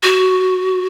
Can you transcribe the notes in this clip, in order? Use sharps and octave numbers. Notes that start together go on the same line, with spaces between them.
F#4